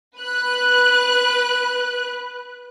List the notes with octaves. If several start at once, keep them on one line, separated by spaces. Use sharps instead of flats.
B4 F#6